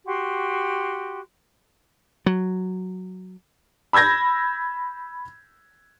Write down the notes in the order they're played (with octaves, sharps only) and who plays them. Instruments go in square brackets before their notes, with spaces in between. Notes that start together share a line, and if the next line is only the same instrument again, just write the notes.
[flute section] F#4 G4 C6
[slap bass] F#3
[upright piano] B5 E6 G6 G#6 A#6